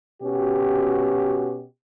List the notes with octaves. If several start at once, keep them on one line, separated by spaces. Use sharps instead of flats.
B2 C#4 F#4 G4